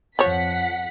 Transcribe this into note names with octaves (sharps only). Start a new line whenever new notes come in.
F2 F3 C#5 F#5 B6